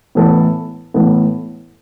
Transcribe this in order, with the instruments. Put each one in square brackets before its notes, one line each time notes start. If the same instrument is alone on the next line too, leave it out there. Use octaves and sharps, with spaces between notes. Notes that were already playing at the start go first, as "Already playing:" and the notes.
[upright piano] A2 E3 B3 A4
A2 E3 B3 A4